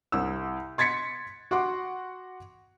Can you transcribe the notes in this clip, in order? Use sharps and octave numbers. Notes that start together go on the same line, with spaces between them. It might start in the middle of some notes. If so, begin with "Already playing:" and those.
C2 E6
C6 G#6 A6 B6 C#7
F#4 F#5 C6 D6